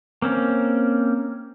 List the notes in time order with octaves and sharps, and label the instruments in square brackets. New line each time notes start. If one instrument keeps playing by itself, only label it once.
[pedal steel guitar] A#3 C4 C#4